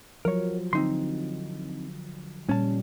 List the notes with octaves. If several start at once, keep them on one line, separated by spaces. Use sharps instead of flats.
F3 F#3 A#4 C#5
D3 C4 D#4 C6
A#2 G3 C#4 A5